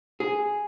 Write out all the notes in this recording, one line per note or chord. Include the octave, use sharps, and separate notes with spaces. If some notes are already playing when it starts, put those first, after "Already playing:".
G#4